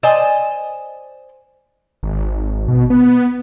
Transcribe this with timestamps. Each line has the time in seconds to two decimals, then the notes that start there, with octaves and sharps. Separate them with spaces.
0.03 C5 D5 D#5 G#5 A5
2.03 G#1
2.68 B2
2.90 B3